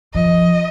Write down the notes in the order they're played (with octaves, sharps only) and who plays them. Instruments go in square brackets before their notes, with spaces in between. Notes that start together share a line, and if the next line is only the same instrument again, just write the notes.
[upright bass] F3 [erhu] D#5